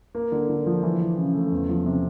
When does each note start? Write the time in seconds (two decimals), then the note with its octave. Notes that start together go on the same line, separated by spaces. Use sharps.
0.15 A#3
0.32 D3
0.49 D3
0.66 F3
0.83 E3
1.00 E3
1.18 C#3
1.34 A3
1.52 E2
1.69 F3
1.86 C3